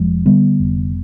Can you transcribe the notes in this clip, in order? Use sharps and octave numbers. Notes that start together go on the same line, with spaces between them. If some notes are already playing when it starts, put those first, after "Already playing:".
Already playing: F1 F3 G#3
D3 G3 B3
F1